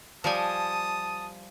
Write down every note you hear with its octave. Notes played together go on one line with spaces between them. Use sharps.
F3 G3 G#5 A5 D#6